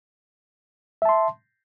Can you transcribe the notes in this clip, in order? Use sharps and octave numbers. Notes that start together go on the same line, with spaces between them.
E5 A5 C6